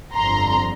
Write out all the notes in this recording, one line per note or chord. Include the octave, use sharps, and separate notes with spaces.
G1 F2 D3 F3 A#5 C6